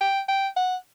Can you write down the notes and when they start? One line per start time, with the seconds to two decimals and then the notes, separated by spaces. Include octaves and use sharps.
0.01 G5
0.28 G5
0.56 F#5